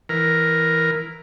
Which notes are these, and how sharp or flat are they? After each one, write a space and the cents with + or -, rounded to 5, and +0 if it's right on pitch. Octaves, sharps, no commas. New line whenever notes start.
E3 +0 A#4 +0